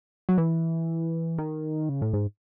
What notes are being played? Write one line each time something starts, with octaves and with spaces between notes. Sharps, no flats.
F#3
E3
D#3
C#3
A2
G#2